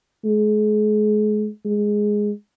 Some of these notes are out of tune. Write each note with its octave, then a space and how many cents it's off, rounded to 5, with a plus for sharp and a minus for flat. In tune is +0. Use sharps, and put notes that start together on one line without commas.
G#3 +35
G#3 +0